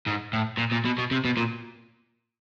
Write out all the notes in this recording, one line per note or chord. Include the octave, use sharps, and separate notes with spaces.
G#2
A2
A#2
A#2
B2
B2
C3
B2
A#2